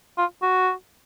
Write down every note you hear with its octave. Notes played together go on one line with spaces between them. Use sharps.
F4
F#4